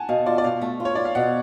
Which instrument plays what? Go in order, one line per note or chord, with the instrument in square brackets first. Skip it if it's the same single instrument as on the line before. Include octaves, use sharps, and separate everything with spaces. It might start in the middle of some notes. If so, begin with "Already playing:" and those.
Already playing: [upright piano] F#5 G#5 A5
[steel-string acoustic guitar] B2 [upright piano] F5
[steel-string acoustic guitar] F4 [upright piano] D5
[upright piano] D5
[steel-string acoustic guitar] B2 [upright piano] F5
[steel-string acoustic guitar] A3
F4
[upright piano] C#5
[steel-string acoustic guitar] F4 [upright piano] D5
[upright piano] F5
[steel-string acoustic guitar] B2 [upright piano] F#5